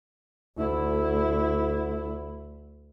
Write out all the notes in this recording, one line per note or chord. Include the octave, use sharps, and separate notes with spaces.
D2 E4